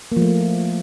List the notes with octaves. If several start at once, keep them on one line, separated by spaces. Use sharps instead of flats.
F3 A3 A#3